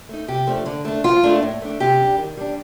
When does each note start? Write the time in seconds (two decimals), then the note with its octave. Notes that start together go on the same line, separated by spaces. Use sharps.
0.09 A3 D#4
0.28 C3 G4
0.47 F3 A3 D4
0.66 D3
0.85 A3 D4
1.04 F3 F4
1.23 A3 D4
1.42 A2
1.62 A3 D4
1.80 C3 G4
1.99 G3 D4
2.18 D#3
2.37 G3 D4